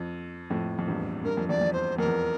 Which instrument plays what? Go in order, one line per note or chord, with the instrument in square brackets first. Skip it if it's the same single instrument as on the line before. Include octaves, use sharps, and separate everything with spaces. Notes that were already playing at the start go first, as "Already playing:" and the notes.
Already playing: [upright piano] F2
F2 A2
F2
E2 G2
[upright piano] G2 [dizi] A#4
[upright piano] F2
[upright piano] E2 [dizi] D5
[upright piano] F2
[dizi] C5
[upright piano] F2 [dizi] A#4
[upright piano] E2